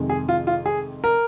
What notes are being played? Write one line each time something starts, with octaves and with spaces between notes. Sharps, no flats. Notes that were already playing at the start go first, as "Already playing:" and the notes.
Already playing: F2 C3 D#3 G#3
G#4
F4
F4
G#4
A#4